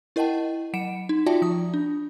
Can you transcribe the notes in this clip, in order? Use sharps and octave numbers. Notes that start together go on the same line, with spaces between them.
E4 A#4 D#5 F#5 G5 A5
F#3 F#5 C#7 D7 E7
D#4
F4 F#4 D5 E5 G5 A5
F3 D#6
D4